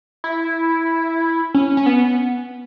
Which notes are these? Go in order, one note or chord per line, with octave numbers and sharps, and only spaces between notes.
E4
C#4
C#4
B3